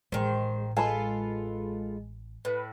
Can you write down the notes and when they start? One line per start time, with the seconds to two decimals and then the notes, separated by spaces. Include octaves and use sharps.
0.12 A1 D#3 G#3 C5
0.77 G#3 F4 A4 B4 G#5 A5 B5
2.45 A2 B4